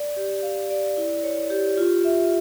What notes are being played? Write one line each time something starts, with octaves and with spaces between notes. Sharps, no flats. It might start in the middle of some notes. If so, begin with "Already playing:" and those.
Already playing: D5
G4
F5
D5
E4
C#5
G4
F4
E5